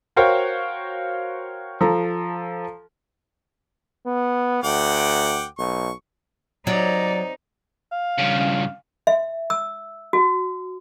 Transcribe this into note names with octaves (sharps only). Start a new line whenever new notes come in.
F#4 A#4 C5 C#5 F5 G5
F3 A4 A#5
B3
D2 F#5 G5 D6
B1 C#6
C3 F#3 D#4 D5
F5
G2 C#3
E5
E6
F#4